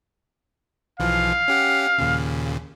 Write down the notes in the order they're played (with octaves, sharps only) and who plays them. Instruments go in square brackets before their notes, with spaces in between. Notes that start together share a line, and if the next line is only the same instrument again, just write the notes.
[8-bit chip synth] B1 E3 F3 [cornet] F5
[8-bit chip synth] C#4 G4 F#5
D#2 A#2 C#3